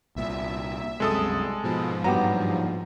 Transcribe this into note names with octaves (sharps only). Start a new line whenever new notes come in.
C2 A#2 E5
C2 F#2 C3 G#3 A4 D#6
G#2 B2 F3
G2 A#2 F#3 B3 G4 A#5